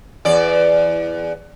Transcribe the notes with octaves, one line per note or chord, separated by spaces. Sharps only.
E2 D5